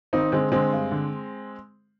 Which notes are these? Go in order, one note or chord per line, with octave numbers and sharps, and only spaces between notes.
G#1 C4 D#4
D3 G#3 C4
D3 G#3 C4
G2
D3